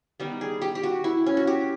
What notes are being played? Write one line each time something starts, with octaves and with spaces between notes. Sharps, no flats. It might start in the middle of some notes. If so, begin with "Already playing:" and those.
D#3 G3 B3
G#4
G4
G4
F#4
E4
C#4
F#4
G4